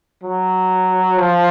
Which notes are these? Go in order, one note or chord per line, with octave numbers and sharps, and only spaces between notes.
F#3
F3